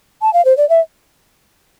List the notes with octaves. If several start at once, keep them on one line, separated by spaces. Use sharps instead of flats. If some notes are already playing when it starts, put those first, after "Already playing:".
A5
F5
C5
D5
E5